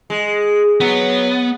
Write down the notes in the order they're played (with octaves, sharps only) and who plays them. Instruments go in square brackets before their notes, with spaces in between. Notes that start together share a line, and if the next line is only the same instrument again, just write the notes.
[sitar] G#3
[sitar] F#3 [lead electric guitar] B3